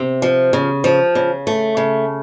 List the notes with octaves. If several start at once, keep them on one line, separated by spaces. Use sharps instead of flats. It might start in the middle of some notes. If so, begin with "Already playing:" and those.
Already playing: C3
F3
C#3
F3
C#3
A3
C#3